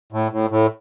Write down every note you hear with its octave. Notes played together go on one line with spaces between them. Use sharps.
A2
A2
A2